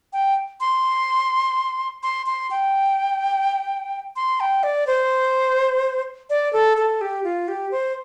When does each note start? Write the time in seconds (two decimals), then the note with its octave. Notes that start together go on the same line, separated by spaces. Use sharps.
0.13 G5
0.60 C6
2.03 C6
2.26 C6
2.51 G5
4.16 C6
4.40 G5
4.63 D5
4.87 C5
6.30 D5
6.53 A4
6.77 A4
7.01 G4
7.24 F4
7.48 G4
7.71 C5